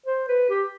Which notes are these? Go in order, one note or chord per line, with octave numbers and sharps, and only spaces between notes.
C5
B4
G4